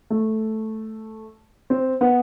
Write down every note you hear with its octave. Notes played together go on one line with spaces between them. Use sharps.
A3
C4
B3